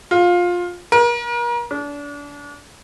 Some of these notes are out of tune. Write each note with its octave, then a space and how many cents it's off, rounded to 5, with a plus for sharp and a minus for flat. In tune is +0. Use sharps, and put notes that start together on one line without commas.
F4 +15
A#4 +40
D4 -30